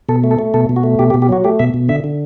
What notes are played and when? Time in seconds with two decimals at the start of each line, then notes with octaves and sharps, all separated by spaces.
0.09 B2 A4
0.24 A3
0.31 A4
0.39 A3
0.54 B2 A4
0.69 B2
0.76 F#4
0.84 A3
0.99 B2 G4
1.10 G4
1.14 B2
1.22 G4
1.29 F#3 F#4
1.44 A3 G4
1.59 B2 E5
1.74 B2
1.89 D3 E5
2.04 D3